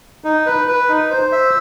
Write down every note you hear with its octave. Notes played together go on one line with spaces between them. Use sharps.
D#4
B4
B4
D#4
C5
E5